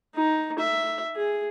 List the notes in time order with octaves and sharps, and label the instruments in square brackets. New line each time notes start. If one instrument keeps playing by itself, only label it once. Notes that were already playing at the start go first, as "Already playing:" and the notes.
[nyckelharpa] D#4
E5
G#4